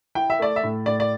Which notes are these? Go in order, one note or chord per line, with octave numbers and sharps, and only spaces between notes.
E4 G5
E5
A3 D5
E5
A2
A2 D5
D5